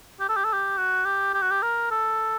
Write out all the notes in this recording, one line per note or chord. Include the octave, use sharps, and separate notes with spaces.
G4
A4
G4
A4
G4
F#4
G4
G4
F#4
G4
A#4
A4